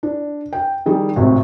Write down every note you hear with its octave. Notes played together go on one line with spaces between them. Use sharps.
D4
G5
D#3 G3 G#4
G#1 A2 C3